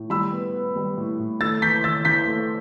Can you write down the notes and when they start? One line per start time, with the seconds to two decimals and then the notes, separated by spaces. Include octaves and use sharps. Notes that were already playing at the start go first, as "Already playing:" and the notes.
Already playing: A2
0.10 G3 B5 E6
0.32 B3
0.53 B3
0.76 G3
0.97 A2
1.19 A2
1.41 A3 E6 A6
1.62 E3 G6 B6
1.84 E3 E6 A6
2.05 E3 G6 B6
2.27 A3